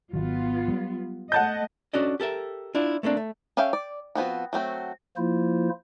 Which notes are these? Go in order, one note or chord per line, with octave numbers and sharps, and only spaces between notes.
G#1 D#3 F#3 B3 F4
F#3 G3
A3 D#5 F#5 A5 G6
C#4 D4 F#4 A4 D5 D#5
G4 A4 A#4 E5
D4 E4 F4
A3 A#3 C4 D4
A3
C#4 A4 E5 F5 G5
D5
F3 B3 C4 F#4
F#3 A3 C4 F#4
F3 A#3 E4 F4 C5